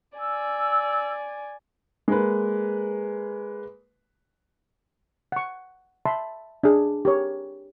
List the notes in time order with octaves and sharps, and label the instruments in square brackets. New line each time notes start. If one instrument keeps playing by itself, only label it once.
[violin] D5 G#5 [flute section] E6
[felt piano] G#3 A#3 B4
[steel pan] F#5 C#6
E5 A5 B5 C6
D4 G#4
G4 A#4 C#5